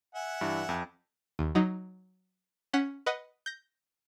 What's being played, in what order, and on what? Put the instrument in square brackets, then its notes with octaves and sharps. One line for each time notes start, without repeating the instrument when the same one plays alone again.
[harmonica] E5 F#5 G#5
[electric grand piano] G2 E3
F2
[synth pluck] D#2
F#3 D#4
C#4 F#5 B6
B4 D#5 F#5
G6 A#6